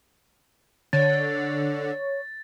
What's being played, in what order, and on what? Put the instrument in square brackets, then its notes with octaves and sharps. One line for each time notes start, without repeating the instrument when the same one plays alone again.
[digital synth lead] D3 [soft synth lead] C#5 [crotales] A6